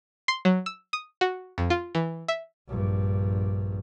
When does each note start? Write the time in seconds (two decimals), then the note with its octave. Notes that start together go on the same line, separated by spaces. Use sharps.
0.28 C6
0.45 F#3
0.66 E6
0.93 D#6
1.21 F#4
1.58 F2
1.70 F4
1.95 E3
2.28 E5
2.69 A#1 G2